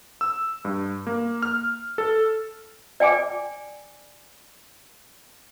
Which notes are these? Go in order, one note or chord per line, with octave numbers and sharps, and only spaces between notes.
E6
G2
A#3
F6
A4
D5 G5 G#5 D6